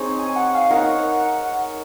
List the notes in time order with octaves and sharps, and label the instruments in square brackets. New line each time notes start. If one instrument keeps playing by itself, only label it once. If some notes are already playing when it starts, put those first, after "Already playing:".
Already playing: [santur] C4 D#4 G#4 C#5
[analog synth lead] G#5
F#5
F5
[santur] D#4 A#4 C#5 [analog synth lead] F#5